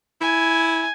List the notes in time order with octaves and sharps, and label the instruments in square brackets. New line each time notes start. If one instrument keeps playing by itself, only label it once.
[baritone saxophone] E4 [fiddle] G#5